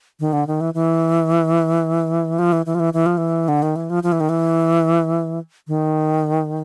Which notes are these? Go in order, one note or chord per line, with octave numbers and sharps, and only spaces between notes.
D#3
D3
D#3
E3
E3
F3
E3
E3
F3
E3
E3
F3
E3
D3
D#3
E3
F3
F3
E3
D#3
E3
D#3